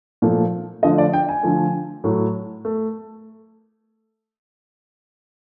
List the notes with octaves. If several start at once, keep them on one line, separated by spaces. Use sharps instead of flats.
A#2 F3 A3
D3 F3 A3 D#5
D5
G5
G#5
D3 F3 A3
A2 F#3 A3
A3